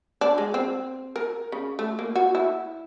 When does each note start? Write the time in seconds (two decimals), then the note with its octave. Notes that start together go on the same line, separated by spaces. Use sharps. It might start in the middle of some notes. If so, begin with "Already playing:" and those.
0.21 D4
0.38 G#3
0.54 C4
1.16 A#4
1.52 C#3
1.79 A3
1.99 A#3
2.16 F#4
2.35 E4